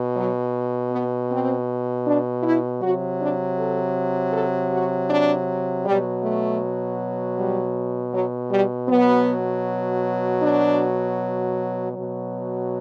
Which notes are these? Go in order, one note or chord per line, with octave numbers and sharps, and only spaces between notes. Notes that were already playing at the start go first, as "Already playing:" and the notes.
Already playing: B2
F#3
B3
C4
D4
E4
C3 F#3 F#4
D4
A4
A4
F#4
D4
B2 F#3 G3
A3
G3
F#3
G3
B2 F#3 B3
D4
B2 F#3